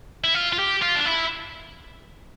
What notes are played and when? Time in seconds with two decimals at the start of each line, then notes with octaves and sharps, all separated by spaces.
0.24 E4
0.34 F4
0.53 F4
0.59 G4
0.82 F4
0.95 D4
1.06 E4